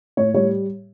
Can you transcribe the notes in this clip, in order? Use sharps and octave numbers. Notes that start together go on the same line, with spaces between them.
A2 C#5
G3 C#5